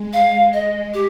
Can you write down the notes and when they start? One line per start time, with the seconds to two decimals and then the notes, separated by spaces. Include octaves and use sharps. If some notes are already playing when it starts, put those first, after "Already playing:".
Already playing: G#3
0.13 F5
0.53 D#5
0.94 G4